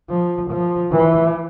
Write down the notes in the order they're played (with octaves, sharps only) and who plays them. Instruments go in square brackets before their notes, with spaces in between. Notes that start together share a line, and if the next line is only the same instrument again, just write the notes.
[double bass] F3
F3
E3